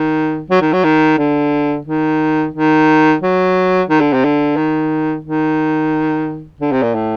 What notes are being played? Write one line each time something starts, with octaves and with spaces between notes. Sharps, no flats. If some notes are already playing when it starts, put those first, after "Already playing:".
Already playing: D#3
F#3
D#3
F#3
D#3
D3
D#3
D#3
F#3
D#3
D3
C3
D3
D#3
D#3
D3
C3
A#2
A2